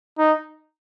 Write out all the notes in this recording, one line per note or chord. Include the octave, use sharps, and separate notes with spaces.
D#4